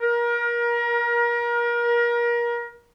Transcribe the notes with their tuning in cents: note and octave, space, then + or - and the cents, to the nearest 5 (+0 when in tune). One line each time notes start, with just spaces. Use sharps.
A#4 +30